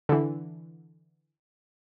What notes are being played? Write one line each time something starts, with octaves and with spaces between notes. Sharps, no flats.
D3 E3